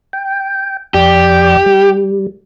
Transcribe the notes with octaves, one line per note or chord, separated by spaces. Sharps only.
G5
F2 G4 D5
G3